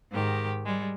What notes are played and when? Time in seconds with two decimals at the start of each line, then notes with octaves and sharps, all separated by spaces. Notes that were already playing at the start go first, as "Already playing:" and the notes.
0.12 G#2 D#3 G4
0.65 G3 G#3